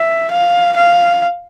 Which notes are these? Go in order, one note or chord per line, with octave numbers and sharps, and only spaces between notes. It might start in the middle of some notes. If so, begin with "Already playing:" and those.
Already playing: E5
F5
F5